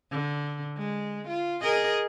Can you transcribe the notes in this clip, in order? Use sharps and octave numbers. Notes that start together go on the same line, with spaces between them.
D3
G#3
F4
G#4 A#4 D#5